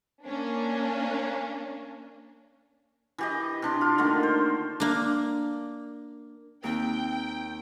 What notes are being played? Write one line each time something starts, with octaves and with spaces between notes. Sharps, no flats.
A#3 C#4 D4
E3 G4 D#5
C3 D4 C6
F4
D3 D#3 A3 A#3
C5
A#3 D4
D#2 C4 G5